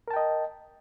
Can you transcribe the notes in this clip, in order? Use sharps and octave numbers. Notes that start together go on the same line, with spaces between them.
A#4 D#5 G5 A5